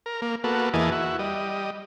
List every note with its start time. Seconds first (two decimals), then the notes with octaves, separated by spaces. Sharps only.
0.06 A#4
0.22 A#3
0.44 A#3 B3 F#4 A4
0.73 E2 E3 A#3 G#4 D#5 A5
0.92 E4 F#4
1.19 G3 D#5